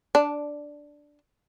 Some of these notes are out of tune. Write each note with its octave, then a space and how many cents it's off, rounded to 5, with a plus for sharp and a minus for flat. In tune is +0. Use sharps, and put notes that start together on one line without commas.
D4 +0